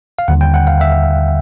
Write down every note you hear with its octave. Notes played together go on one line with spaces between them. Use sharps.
F5
D#2 D3 G3 F#5
G5
F#5
F5
E5